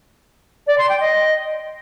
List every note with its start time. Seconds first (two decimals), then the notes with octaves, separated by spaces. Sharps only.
0.67 D5
0.78 C6
0.89 G5
1.00 D#5